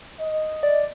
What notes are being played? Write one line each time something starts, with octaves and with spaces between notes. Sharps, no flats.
D#5
D5